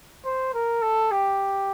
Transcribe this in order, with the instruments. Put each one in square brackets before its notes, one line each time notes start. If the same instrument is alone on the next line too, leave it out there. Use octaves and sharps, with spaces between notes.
[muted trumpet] C5
A#4
A4
G4